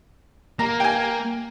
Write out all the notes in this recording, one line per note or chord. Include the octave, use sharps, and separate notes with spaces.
A#3 A#5
G5 G#5